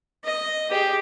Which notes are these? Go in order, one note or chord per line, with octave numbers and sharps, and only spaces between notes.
D#5
G4 G#4